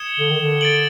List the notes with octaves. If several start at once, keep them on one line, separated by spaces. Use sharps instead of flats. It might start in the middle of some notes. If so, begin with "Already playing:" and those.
Already playing: D#6 G#6 C#7 E7 G7
D3
D#3
D3
A6 D7 F#7